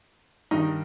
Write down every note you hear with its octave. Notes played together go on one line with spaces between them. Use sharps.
G2 D#3 D#4